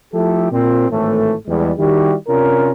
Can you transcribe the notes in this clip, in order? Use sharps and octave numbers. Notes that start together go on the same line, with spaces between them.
F3 A3 E4 G4 A4
A#2 C4
G#1 A2 E3 A3
E2 G3 G#3
D#3 G3 E4 F#4 G4
C3 C#4 D4 F4 A#4